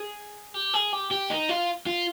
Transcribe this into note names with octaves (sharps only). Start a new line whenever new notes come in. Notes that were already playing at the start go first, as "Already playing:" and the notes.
Already playing: G#4
G4
G#4
G4
G4
D#4
F4
F4